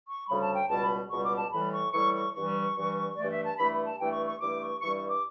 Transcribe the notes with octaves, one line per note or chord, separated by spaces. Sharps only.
C#6
D2 C#3 G3 B5
A5
G5
C#2 B2 G3 A5
B5
C#2 B2 G3 C#6
D6
A5
A2 E3 G3 B5
C#6
A2 E3 G3 C#6
C#6
G2 E3 G3 C#6
G2 E3 G3
G2 E3 A3 D5
E5
A5
G2 E3 A3 B5
B5
A5
G2 E3 A3 G5
C#6
C#6
G2 E3 A3 D6
C#6
G2 E3 G3 C#6
C#6
D6